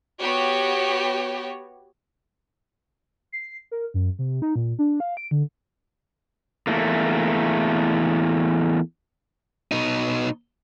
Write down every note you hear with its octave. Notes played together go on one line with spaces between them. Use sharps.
B3 F#4 G4 C#5
C7
A#4
F#2
C3
D#4
A#2
D4
F5
D7
D3
E2 A3 A#3
B2 D#4